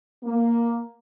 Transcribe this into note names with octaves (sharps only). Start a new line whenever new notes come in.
A#3